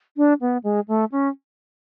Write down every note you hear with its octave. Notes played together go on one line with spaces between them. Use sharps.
D4
B3
G#3
A3
C#4